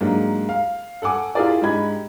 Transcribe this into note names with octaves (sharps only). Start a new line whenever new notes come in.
G#2 F#3 A#3 D4 G4
F5
A4 F#5 G#5 D6
E4 F4 G4 G#4 A#4 D5
G#2 D4 G4 D#5 B5 G#6